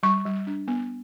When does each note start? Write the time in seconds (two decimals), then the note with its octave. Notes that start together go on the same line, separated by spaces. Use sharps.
0.03 G3 C#6
0.25 G3
0.47 D4
0.68 B3